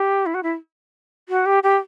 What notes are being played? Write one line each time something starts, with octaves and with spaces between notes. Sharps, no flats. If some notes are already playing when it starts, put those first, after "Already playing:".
Already playing: G4
E4
F#4
E4
F#4
G4
G4